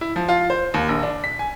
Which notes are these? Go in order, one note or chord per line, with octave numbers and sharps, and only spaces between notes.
E4
F3
F4
C5
D#2
A#1
D4
B6
G#5